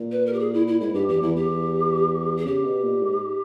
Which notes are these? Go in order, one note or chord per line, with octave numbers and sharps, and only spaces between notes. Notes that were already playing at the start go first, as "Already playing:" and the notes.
Already playing: A#2
B4
A#4
G4
G#4
E4
E4
G#2 E4
G2 G4
E2 G4
E2 E4
E2 G4
G#4
C#3 G4
B2
A#2
G#2